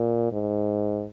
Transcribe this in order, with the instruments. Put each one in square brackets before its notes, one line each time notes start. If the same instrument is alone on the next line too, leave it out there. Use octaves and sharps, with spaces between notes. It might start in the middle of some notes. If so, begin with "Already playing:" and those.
Already playing: [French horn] A#2
G#2